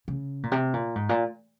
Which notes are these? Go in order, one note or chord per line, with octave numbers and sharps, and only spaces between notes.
C#3
A#2
C3
A#2
G#2
A#2